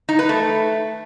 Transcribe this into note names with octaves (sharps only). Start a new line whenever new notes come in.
D#4
B4
A3